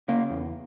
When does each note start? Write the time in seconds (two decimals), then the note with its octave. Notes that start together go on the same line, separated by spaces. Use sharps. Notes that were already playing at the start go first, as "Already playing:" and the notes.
0.08 C#3 A#3
0.30 E2